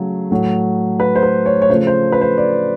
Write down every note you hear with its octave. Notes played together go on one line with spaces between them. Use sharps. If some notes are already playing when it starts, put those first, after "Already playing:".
Already playing: C#3 F#3 A3
A2 F#3 A3
B4
C5
B4
C#5
C#5
C#3 F3 A3 C5
C5
B4
C5
D5